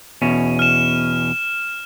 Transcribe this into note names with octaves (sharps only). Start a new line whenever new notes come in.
E2 B2 C#4
F6 E7